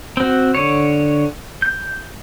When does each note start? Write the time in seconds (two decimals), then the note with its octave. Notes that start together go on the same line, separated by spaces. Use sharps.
0.17 C4 F#4
0.54 D3 C#5
1.62 G6